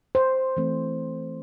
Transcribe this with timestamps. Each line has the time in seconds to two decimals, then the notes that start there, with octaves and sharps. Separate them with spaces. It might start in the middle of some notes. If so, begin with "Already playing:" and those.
0.15 C5
0.57 E3 A3 C4